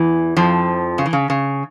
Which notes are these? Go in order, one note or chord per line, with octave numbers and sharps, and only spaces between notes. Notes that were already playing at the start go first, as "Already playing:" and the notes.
Already playing: E2 E3
F2 F3
C#3
E3
C#3
C#3